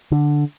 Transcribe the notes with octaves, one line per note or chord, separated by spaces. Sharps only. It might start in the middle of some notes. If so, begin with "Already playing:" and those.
D3